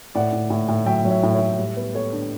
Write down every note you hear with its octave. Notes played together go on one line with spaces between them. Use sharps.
A2 D5 F#5
A2
A2
A2
F#3 E5 G5
F#3
C#5 E5
A2
C#5 E5
A2
G3
B3
B3 A4 C#5
D4